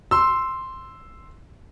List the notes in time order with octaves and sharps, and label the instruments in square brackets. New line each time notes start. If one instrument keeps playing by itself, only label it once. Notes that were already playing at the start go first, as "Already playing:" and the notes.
[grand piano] C6 E6